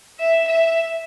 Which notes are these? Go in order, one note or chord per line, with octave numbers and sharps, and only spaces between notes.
E5
E5